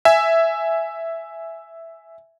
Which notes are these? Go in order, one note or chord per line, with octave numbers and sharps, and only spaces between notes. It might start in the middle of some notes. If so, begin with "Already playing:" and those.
E5 G#5